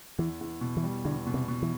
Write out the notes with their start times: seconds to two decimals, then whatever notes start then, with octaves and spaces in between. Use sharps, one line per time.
0.18 E2 E3
0.41 E2
0.61 B2
0.77 E3
0.83 G3
1.04 E2 D3
1.27 B2
1.34 C3
1.48 B2
1.62 E3